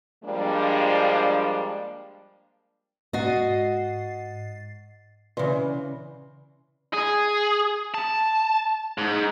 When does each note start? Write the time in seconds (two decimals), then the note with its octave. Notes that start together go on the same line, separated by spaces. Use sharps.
0.24 F3 G3 G#3 A#3 D4
3.13 G#2 F#4 D#5 A6 C7
5.37 C#3 E3 B4 D5 C6
6.94 G#4
7.94 A5
8.98 G#2